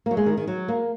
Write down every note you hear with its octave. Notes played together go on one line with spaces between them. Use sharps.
F#3 A#3
G#3
D#3
D#3
F#3
A#3